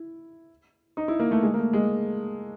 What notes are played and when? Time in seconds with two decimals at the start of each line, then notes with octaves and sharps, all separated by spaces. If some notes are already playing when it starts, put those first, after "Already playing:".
Already playing: E4
0.97 D#4
1.08 E4
1.19 A#3
1.31 A3
1.43 G#3
1.54 A#3
1.58 A3
1.73 G#3